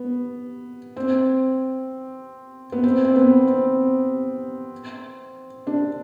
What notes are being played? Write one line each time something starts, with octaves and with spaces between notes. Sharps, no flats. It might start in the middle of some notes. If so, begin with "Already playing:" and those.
Already playing: B3
C4
B3
C4
C4
B3
C4
D4